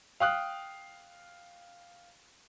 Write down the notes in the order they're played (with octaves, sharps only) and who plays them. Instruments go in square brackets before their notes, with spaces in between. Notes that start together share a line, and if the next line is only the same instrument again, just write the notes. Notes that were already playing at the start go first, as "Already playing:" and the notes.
[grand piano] F5 G5 D#6 F6 F#6